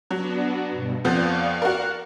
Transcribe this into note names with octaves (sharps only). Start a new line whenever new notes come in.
F#3 B3 D4 F#4
G2 B2
F2 F3 B3 D5 F5 C#6
F#4 A#4